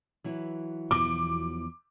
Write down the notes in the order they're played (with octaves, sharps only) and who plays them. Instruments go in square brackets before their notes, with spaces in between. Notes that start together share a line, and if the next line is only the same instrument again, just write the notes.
[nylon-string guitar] E3 F#3 E4
[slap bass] E2 B2 F3 [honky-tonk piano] D6